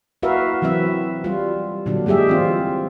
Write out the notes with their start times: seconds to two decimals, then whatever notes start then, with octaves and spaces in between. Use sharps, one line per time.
0.23 E4 F#4 A#4 B4 E5 F5
0.62 E3 F#3 C4 B4 E5
1.24 G3 F4
1.86 A#2 D3 F#3 D4
2.06 G3 G#3 G4 G#4 E5
2.28 E3 C4 F4